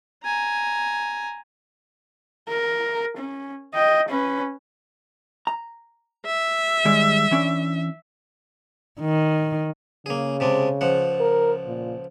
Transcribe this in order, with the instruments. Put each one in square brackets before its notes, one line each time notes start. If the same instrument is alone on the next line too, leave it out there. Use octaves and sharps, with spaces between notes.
[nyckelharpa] G#5 A#5
[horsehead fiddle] A#4
C#4
D#5 G5
C#4 B4
[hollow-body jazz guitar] A#5
[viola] E5
[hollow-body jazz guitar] D#3 G3 G#3
E3 C#4 D4
[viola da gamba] D#3
[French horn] C#3 [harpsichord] A#3 G#4
[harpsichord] C3 G#3 D4
C#2 F3 F#5
[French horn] A#4
A#2